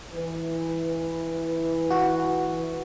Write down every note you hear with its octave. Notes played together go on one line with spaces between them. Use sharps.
E3 B4
F#4